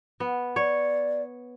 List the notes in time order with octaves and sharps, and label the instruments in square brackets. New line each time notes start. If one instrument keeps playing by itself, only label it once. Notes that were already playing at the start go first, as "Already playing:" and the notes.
[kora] B3
[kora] C#5 [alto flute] D5